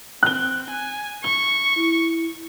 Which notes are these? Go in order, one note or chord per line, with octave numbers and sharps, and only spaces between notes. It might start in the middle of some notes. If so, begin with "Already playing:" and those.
C4 F#6 G7
G#5
C#6 G7
E4